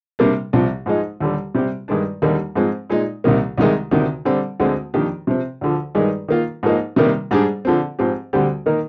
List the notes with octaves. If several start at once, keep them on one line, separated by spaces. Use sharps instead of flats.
C3 G3 A#3 D4
C2 C3 F3
G#2 F3 G#3 D#4
D#2 D3 G3
C3 G3 C4 G4
G2 D#3 G#3 D4
D#2 D3 G3 A#3 D#4
G#2 F3 G#3 C4
A#2 G#3 D#4
C2 C3 D#3 A#3
C2 C3 D#3 G#3
D2 C3 D#3
D3 G3 C4
D2 D3 G#3 C4
F2 D#3 A#3 D4 G4
C3 F3 C4
D2 D3 F3
G2 D#3 G#3 D#4 G#4
D#3 A#3 F4
G#2 F3 A#3 D#4
C3 D#3 G3 A#3
G#2 G3 D4 G#4
D3 F3 C4
G#2 F3 C4 G4
D2 D3 G3 C4 G4
D#3 A#3 D#4 A#4